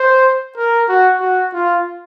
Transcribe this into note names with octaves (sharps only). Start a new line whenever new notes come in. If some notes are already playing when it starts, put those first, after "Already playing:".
Already playing: C5
A#4
F#4
F#4
F4